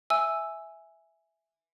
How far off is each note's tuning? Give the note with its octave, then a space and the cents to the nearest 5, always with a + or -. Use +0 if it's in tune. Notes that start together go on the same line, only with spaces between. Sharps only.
E5 +0 G#5 +0 E6 +0